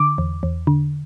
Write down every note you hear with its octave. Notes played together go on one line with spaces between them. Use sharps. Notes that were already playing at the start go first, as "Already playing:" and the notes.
Already playing: D3 D6
E2
E2
D3